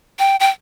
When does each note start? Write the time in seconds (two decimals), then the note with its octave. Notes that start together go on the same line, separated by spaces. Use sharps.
0.19 G5
0.40 G5